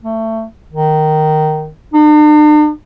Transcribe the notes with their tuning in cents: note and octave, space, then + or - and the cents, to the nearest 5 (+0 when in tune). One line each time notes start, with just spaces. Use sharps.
A3 +20
D#3 -10
D4 +45